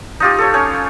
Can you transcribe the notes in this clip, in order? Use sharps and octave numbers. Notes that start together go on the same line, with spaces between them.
D#4 F4 G4
A4 C#5
C#4